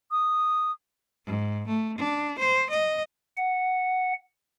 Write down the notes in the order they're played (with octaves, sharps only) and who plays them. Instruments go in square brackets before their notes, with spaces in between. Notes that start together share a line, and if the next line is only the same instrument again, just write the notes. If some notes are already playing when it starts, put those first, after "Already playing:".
[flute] D#6
[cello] G#2
A3
D4
C5
D#5
[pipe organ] F#5